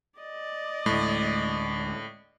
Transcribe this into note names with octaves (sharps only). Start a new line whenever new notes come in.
D5 D#5
D2 A2 G#3